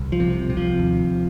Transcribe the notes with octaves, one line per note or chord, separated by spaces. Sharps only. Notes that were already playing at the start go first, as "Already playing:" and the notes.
Already playing: C2
F3
C3
C3
F3
D#2